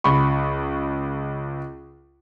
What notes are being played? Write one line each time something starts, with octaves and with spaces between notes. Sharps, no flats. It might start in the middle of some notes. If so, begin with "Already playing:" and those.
C#2 B5 C#6